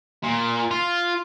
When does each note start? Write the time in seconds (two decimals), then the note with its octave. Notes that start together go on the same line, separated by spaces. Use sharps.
0.24 A#2
0.71 F4